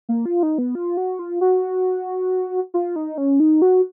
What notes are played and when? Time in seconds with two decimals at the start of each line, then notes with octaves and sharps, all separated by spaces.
0.09 A#3
0.26 F4
0.43 D#4
0.58 B3
0.75 F4
0.97 F#4
1.19 F4
1.41 F#4
2.74 F4
2.96 D#4
3.18 C#4
3.40 D#4
3.62 F#4